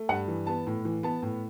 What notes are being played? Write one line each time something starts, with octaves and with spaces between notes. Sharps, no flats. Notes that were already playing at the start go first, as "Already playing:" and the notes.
Already playing: A3
G2 F#5
E3
B3 A5
A2
E3
B3 A5
A2